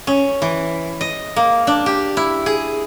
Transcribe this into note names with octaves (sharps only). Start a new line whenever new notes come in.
C#4
E3
D#5
A#3
D4
G4
E4
G#4